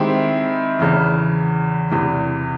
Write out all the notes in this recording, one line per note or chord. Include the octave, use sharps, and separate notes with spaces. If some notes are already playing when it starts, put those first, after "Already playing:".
Already playing: D#3 G#3 C4 E4 G4
E2 C#3 E3
E2 C3 E3